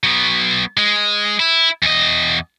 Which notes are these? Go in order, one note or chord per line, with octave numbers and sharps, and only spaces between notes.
F#3 B3
G#3
E4
E2 D#5